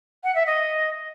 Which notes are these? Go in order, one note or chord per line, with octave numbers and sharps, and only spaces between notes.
F#5
E5
D#5